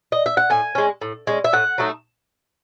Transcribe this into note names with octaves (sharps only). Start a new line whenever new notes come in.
D#5
E5
F#5
A2 G#5
G#3 C#4
A2
G#3 C#4
E5
A2 F#5
F#3 A3 D#4